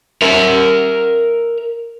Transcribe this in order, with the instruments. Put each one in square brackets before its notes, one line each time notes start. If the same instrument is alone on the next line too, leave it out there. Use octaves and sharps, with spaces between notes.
[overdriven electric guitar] A#4 E5